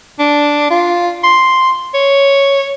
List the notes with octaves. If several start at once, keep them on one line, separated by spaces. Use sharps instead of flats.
D4
F4
C6
C#5